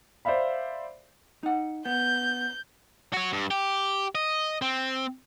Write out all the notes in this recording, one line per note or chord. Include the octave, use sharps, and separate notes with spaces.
C5 D5 E5 F5 B5
D#4 F#5
B3 G6
F#4 C#5
G2
G4
D#5
C4